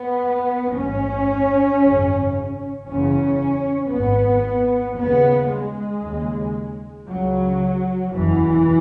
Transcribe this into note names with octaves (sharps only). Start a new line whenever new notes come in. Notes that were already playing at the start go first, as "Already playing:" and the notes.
Already playing: B3
A1 G#2 C#4
G#1 F#2 C#3
F#1 E2 C#3 C#4
G#1 G#2 B3
D#2 C#3 B3
G#3
D#2 C#3
C#2 C#3 F#3
F#1 E2 B2 E3